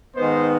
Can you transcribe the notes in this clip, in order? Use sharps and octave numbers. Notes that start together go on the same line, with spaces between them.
G#2 D#3 B3 C5 D#5